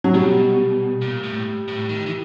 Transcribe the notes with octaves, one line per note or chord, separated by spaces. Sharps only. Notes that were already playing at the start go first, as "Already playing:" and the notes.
F#3
B2 G3
A#2
A2
A2
D#3
E3